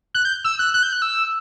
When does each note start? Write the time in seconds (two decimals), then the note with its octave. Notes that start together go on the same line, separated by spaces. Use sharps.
0.15 F#6
0.25 G6
0.44 E6
0.59 F#6
0.74 F#6
0.83 G6
0.92 F#6
1.02 E6